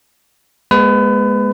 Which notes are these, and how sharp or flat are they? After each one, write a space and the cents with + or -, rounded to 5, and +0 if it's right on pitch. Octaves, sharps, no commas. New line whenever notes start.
G#3 +0 B3 -45 B4 +30